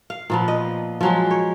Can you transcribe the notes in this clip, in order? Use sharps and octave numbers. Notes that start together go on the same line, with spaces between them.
F5
A#2 F3 B3
D#5
F3 F#3 G#3
C#5